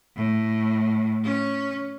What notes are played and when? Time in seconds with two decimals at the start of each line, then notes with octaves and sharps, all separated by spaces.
0.16 A2
1.24 C#4